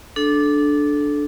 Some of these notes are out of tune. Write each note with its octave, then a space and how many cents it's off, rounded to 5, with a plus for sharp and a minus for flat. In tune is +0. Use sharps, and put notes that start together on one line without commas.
D4 +0 A4 -20